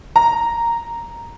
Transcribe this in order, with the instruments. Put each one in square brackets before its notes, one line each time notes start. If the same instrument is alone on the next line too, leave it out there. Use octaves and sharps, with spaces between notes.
[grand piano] A#5